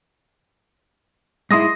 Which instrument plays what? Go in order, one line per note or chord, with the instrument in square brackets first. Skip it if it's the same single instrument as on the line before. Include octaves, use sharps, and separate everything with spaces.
[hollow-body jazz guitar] G#2 G#3 E4 [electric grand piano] C6 D#6 A#6